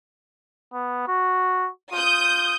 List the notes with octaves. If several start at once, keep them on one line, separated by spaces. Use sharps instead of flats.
B3
F#4
F4 D#6 G6